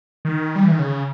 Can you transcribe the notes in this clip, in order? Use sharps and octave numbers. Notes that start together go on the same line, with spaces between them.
D#3
G3
E3
D#3
C#3